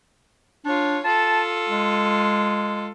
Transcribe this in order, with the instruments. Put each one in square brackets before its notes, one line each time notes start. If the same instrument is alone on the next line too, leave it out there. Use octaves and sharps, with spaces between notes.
[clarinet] D4 [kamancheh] F4 C#5
[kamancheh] F4 A4 [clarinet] A5
[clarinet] G#3